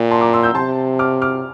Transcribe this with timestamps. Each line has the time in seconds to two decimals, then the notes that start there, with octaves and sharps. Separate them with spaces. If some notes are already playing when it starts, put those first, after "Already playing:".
Already playing: A#2 G5 A#5
0.11 A5 C6
0.21 A#5 D6
0.33 C6 E6
0.43 E6 G6
0.55 C3 A5 C6
0.99 D6 F6
1.22 D6 F6